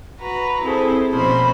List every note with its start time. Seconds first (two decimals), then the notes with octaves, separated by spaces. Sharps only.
0.21 F#4 B4 A#5
0.62 C4 E4 G#4 A4 C5
1.12 B2 F3 A#3 C#4 C5 B5